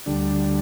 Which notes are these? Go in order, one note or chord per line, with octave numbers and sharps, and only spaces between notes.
D2 D3 G3 D4